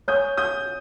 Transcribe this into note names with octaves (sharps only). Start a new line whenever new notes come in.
C#5 G#5 C#6 D#6 G6
D#6 G6